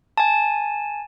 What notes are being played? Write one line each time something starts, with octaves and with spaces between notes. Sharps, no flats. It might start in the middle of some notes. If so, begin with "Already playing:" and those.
G#5 A5